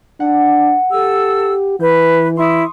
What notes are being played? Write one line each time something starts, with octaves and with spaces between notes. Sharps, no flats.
D4 F#5
G4 A4 E6
E3 B4 G6
E4 C6 C#6 D#6